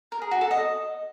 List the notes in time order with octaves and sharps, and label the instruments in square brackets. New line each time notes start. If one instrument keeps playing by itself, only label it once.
[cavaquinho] A#4
G#4
F#4
A4
D#5